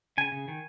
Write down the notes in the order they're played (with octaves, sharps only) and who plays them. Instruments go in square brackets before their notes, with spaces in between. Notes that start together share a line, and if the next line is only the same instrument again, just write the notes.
[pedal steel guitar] C#3 G#5
C#3
D#3